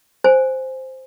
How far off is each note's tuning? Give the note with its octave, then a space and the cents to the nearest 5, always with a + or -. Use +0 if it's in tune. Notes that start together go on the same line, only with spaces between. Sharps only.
C5 +0 G#5 +0